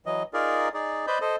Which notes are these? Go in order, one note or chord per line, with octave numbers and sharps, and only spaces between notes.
E3 F#3 D#5
D#4 F4 G#4 A#4 D5
D#4 G#4 D5
B4 C5 D5 D#5 B5 G6
A4 C5 D#5